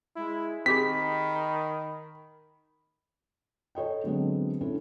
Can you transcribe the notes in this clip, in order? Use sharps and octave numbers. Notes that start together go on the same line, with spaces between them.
G#3 E4
D#3 C4 G4 G#4 B5 B6
A4 C#5 D#5 G5
D3 F#3 G#3 B3 C4
C#4 D4 E4 A4